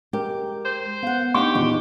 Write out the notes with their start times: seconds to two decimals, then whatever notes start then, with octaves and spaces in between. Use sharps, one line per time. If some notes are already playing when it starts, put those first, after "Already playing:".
0.13 G#3 G4 A#4
0.65 C5
1.03 B3 F5 F#5
1.34 C4 D4 D#4 G4 C#6 D7
1.55 A#1 E2 D#4